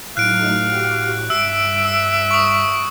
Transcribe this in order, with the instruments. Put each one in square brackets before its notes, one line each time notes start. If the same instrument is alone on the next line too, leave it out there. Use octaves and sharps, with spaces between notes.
[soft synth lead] A2 [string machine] F#3 A3 D#4 [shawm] F5 [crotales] F#6 D7
[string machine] F#4 G4
[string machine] G2 [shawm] E5 [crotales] E6 [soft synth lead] D7
[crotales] E6
C#6 D#6